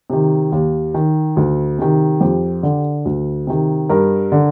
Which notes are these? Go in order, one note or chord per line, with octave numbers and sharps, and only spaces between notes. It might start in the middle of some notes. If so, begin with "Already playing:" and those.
C3 D#3
D#2
D#3
D2
C3 D#3
F2 G4
D3
D2
C3 D#3
G2 A#4
D3